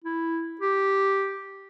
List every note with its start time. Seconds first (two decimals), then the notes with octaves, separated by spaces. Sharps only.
0.04 E4
0.61 G4